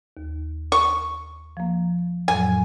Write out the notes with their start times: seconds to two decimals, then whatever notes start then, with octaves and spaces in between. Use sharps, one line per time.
0.17 D#2
0.72 C#6
1.57 F3 A#3
2.28 F2 A2 F#3 G#5